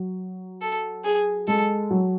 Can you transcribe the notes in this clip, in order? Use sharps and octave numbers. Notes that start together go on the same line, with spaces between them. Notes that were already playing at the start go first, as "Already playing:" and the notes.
Already playing: F#3
A4
G#4
G#3 A4
F#3